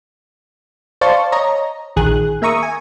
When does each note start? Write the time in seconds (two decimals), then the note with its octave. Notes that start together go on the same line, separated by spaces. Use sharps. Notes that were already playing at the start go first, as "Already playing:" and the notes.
1.01 C5 D5 F5 A5 C#6
1.32 C#5 D#5 A#5
1.96 A#1 D#3 G#4 F#6
2.42 A#3 E5 A#5 C#6 D#6
2.63 G#5